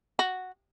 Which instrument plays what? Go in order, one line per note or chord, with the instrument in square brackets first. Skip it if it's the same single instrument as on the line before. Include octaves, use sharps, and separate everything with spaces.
[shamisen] F#4